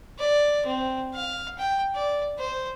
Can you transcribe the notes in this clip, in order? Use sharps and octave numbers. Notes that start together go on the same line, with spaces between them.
D5
C4
F5
G5
D5
C5